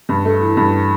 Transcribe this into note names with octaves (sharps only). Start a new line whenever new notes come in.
G2
A3
E3
G2